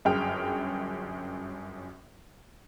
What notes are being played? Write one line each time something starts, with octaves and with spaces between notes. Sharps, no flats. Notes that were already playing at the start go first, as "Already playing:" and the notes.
G1 F#2 G#4 G5 F6